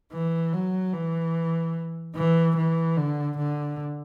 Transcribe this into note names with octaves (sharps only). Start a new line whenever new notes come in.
E3
F#3
E3
E3
E3
D3
D3